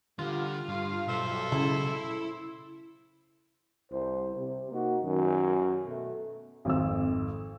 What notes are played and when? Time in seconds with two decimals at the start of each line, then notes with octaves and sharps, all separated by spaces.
0.19 G2 D3 F4
0.69 G2 F5
1.08 B1 A4 C5 E5
1.52 C#3 E4
3.92 C2 C5
4.36 C3
4.72 A#3 D#4 F#4
5.04 F#2 D#3
5.86 B2 A3
6.65 G#1 F2 E6